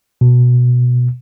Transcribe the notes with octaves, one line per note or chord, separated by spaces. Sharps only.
B2